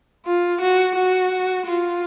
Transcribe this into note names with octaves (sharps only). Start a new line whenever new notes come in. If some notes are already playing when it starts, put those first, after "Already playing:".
F4
F#4
F#4
F4